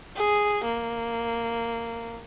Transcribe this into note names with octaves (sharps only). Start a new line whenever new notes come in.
G#4
A#3